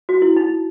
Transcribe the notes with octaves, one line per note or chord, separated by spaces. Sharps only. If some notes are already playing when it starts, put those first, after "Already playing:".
F#4
E4
D#4